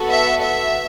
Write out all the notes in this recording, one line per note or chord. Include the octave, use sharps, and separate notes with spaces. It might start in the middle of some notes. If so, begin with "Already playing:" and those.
Already playing: B3 F#4 A4
E5
E5